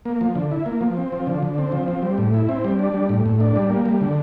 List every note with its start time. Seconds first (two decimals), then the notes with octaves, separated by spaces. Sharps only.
0.05 A#3
0.21 F3
0.35 D3
0.51 E4
0.66 A#3
0.81 F3
0.97 C4
1.12 F3
1.27 D3
1.42 D3
1.58 C4
1.72 F3
1.88 C4
2.03 G3
2.18 A2
2.34 E4
2.49 C4
2.64 G3
2.79 D4
2.94 G3
3.09 A2
3.25 A2
3.40 D4
3.56 G3
3.70 A#3
3.86 G3
4.01 D3